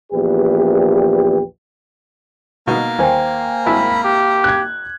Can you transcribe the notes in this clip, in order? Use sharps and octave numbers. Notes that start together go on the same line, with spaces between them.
A#1 E2 G4 B4
B2 A#3 D#4 B4
D#2 C5 G5 G#5
G#1 E4 A5 B5
G4
F#6 G#6